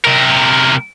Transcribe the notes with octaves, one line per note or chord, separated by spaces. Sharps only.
C3 A#4